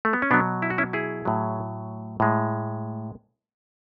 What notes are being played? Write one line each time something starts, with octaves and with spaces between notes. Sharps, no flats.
A3
B3
C#4
B2 F#3 B3 D4
E4
F#4
C#4 E4
E4 G#4
A2 F#3
A2 G#3